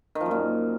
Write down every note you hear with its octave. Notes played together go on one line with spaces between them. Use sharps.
D#3
F3
F#2
A#2